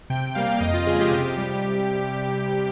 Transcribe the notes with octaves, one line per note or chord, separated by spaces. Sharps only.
C3 G5
G3 A#3 F5
F5
F2 D#5
F4
C#3 G#3 G#4
G4
C3
G3